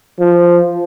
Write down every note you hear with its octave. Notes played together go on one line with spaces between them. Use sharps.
F3